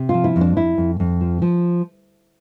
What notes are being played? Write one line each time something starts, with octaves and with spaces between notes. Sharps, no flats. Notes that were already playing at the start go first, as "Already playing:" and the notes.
Already playing: C3
F3 F4
E4
F2
D4
F2 E4
F2
F2
F3
F3